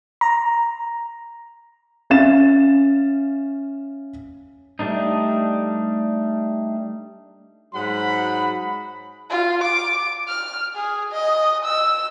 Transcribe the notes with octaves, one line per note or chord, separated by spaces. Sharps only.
A#5
C#4 E5 F5 A6 E7
G3 A3 D4 D#4
G#2 F#3 F#5 B5
F4
D6
F6
G#4
D#5
E6